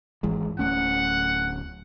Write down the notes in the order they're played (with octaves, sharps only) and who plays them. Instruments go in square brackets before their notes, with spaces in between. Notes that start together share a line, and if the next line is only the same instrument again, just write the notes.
[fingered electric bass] G#1 E3 G#3
[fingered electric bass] D1 A3 C#4 [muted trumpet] F#5